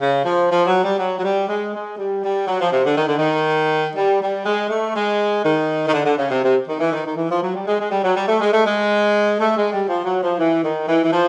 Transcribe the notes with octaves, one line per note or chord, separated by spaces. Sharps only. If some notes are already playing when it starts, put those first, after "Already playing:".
C#3
F3
F3
F#3
G3
F#3
F#3
G3
G#3
G#3
G3
G3
F#3
F3
C3
D3
D#3
D3
D#3
G3
G3
G#3
A3
G#3
D#3
D#3
D3
D3
C#3
C3
C3
D#3
E3
D#3
D#3
E3
F3
F#3
G3
G#3
G#3
G3
F#3
G3
A3
G#3
A3
G#3
A3
G#3
G3
F3
F#3
F3
E3
D#3
E3
E3
F3